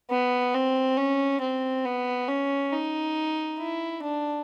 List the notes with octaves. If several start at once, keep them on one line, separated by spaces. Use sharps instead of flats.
B3
C4
C#4
C4
B3
C#4
D#4
E4
D4